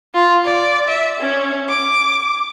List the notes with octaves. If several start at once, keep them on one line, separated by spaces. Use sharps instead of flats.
F4
D5
E5
C#4
D6